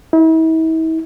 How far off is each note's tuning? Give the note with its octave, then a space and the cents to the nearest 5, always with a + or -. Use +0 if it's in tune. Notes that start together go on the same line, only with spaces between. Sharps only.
E4 -40